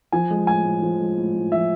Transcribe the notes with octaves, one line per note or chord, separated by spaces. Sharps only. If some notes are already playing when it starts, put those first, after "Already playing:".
F3 G#5
G#3
A2 G#5
A2
F3
G#3
A2
A2
F3 E5